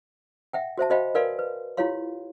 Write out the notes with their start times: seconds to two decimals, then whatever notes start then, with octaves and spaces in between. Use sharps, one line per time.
0.53 E5 F#5 G5
0.78 F#4 C5 E5 A5
0.90 F#4 C5 D#5 F5 G5 B5
1.15 A#4 B4 D5 F5 G#5 C6
1.39 B4
1.77 E4 F4 G4 C#5 F5 C6